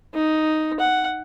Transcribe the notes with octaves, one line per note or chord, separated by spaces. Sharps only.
D#4
F#5